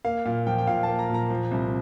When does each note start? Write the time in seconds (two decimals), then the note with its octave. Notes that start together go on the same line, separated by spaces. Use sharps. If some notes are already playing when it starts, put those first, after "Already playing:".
0.05 A#3 F5
0.25 A#2 F5
0.47 F3 G5
0.58 G5
0.67 A#2 F5
0.83 A5
0.88 A#3
0.99 A#5
1.09 A#2 A#5
1.30 F3
1.51 C2